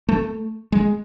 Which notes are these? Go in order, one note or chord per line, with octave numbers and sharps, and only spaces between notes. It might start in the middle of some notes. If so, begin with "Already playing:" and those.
A3
G#3